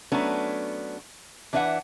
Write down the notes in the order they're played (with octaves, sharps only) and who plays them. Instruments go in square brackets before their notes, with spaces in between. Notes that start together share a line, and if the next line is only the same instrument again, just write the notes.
[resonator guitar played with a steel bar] F#3 A3 B3 C#4 D4
E3 D4 B4 E5 F#5